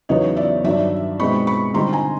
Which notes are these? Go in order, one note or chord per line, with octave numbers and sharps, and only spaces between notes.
E2 C#3 F#3 B3 D#4 C#5 D#5
D5 E5
G2 D#3 F#3 D5 E5
B2 G#3 C4 D#4 B5 C#6
B5 C#6
D3 G3 C4 D#4 A#5 C6
G#5 A#5